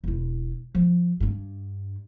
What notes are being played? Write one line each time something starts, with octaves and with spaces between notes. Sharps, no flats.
E1 E4
F3
G2 D4